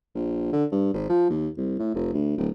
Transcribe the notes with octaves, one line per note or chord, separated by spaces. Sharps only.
A#1
D3
G2
G#1
F3
D#2
C2
A2
F1
D2
D1